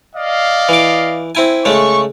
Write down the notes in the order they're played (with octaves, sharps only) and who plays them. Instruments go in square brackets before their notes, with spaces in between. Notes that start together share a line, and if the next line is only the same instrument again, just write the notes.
[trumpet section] D5 D#5 F5
[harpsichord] E3 D6
C4 E4 G#5
[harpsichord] C#3 G#3 A3 [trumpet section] C#6